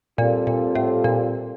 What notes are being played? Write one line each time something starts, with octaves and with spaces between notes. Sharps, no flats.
A#2 G3 C4 F4 A4
A#2
A2
A#2